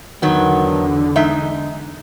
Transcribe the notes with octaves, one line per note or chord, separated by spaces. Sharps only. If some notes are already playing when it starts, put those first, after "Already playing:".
E2 D3 D#3 F#3 B3
G#3 D#4 E5